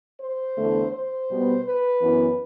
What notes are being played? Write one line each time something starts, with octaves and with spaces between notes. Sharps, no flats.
C5
E2 D3 A3
C5
B2 G3 B3
B4
F#2 E3 B3